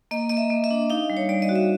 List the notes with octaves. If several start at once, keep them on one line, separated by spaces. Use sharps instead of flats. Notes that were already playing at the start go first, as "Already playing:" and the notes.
A#3 D#5
A#3 D#5
E5
A#3
E5
D4
D#4 F5
G3
C#5
G3 D5
D#5
F#4
E5